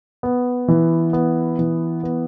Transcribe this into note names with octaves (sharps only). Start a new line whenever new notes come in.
B3
E3
B3
E3
B3